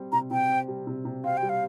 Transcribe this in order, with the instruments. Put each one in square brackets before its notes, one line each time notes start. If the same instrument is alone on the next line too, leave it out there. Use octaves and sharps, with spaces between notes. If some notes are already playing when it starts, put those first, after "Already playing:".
Already playing: [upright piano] G3 C4
[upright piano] C3 [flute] A#5
[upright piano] C3 [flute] G5
[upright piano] C4
G3
C3
C3
[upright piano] C4 [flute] F5
[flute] G5
[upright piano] G3
[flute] F5